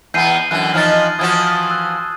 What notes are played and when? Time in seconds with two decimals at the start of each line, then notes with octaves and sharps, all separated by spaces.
0.14 E2 B3 G6 C7 D#7
0.51 F#2 D3 E3 F#6
0.74 E3 F3 D#4 F6 A6
1.19 E3 F3 F#4 D#6 G#6
1.70 E6 F#6